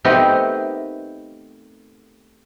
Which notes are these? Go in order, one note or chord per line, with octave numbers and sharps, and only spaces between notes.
A3 B3 C4 D#4 G4 A#4